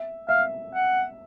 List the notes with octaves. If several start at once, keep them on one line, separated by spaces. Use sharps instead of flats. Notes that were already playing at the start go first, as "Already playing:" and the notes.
Already playing: E5
E5 F5
F#5